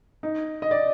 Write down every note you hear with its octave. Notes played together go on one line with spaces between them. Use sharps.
D#4
D#5
D5